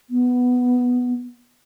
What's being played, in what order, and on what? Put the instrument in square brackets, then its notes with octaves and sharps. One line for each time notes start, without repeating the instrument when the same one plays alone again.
[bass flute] B3